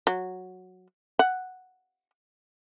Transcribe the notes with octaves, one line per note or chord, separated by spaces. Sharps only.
F#3
F#5